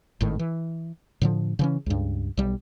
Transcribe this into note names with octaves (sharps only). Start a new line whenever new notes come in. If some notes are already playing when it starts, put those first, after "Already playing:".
G#1 A2 D#3
E3
A2 D3 F3
C#3 E3 C#4
C#2 G2
B1 G3